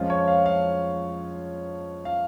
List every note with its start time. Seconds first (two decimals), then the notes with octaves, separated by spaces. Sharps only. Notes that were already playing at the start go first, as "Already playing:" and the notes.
Already playing: F2 F3 G#3 C#4 F4
0.10 C#5
0.28 F5
0.46 F5
2.05 F5